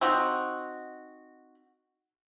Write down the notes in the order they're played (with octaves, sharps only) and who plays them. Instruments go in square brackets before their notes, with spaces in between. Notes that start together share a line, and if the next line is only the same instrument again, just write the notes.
[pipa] C4 D#4 F#4